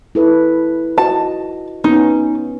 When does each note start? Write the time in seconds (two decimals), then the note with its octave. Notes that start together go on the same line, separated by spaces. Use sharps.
0.15 E4 A4 B4
0.98 F#4 D#5 A5
1.84 B3 C#4 D#4